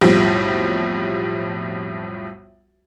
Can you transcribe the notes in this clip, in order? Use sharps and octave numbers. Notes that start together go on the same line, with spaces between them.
B1 F2 A2 F3 G3